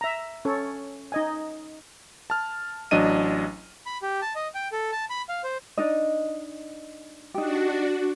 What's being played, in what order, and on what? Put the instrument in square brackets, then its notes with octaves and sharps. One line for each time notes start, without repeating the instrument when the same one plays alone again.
[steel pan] E5 A#5
C#4 A4 C#5
D#4 D#5 G#5
[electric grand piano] A5 F6
A1 F#3 D4 D#5 D#7
[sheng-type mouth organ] B5
G4
A5
D#5
G5
A4
A5
B5
F5
C5
[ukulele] D4 D#4 D#5
[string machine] D4 F#4 [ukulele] D#4 G4